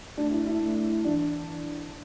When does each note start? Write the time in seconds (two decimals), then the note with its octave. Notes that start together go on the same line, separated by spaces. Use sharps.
0.17 A3 D4
0.31 E4
0.46 E4
0.61 A3
1.05 E3 D4